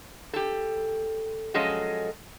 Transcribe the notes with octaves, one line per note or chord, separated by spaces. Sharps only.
G4 A4
F3 F#3 G#3 C#4 A4 D#5